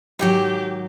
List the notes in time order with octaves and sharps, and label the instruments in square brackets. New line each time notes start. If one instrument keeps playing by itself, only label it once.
[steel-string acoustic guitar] G#2 D#3 F#3 [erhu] G4